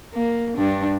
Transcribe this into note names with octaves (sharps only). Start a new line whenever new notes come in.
A#3
G2 D4